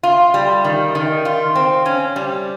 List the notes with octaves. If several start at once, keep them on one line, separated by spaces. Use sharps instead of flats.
F4
G3
D#3
D#3
F4
C4
C#4
G3